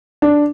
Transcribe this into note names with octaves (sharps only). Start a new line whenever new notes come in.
D4